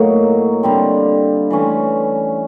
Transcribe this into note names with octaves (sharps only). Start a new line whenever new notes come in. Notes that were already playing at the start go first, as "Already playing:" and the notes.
Already playing: A2 F#3 A#3 D#4
D3 G3 C4
E3 A3 C#4